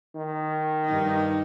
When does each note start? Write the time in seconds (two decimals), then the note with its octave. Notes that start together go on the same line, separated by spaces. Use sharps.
0.16 D#3
0.85 G2 D#4